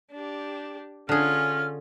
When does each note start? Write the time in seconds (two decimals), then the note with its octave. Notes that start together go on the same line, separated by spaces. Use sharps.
0.12 D4 G4
1.09 D3 C#4 F4 G#4 F6